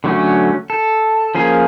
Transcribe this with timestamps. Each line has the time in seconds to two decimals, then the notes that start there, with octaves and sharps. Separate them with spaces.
0.04 D3 F#3 A3 C#4
0.70 A4
1.35 F3 A#3 C#4 G#4